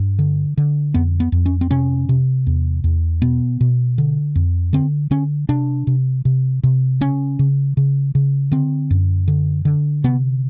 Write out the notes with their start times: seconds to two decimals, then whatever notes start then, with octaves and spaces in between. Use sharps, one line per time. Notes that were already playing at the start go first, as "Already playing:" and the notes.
Already playing: G2
0.19 D3
0.57 D3
0.94 F2 B3
1.20 B3
1.32 F2
1.46 C#4
1.61 C4
1.71 C3 C#4
2.09 C3
2.47 E2
2.84 E2
3.22 B2 B3
3.61 B2
3.98 D3
4.36 F2
4.73 D3 C4
5.11 D3 C#4
5.49 C3 D4
5.87 C3
6.25 C3
6.63 C3
7.01 C#3 C#4
7.39 C#3
7.77 C#3
8.15 C#3
8.52 D3 C4
8.91 F#2
9.28 D3
9.65 D3
10.04 C3 B3